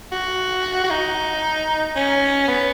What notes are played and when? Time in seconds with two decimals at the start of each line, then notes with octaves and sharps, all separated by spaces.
0.12 F#4
0.84 F#4
0.90 D#4
1.96 C#4
2.48 B3